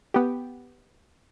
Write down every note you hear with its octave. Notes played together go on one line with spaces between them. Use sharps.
B3 G4